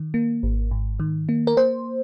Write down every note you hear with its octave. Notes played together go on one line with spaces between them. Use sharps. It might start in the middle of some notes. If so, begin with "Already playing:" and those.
Already playing: D#3
A#3
G#1
G#2
D#3
A#3
A#4
A#3 C5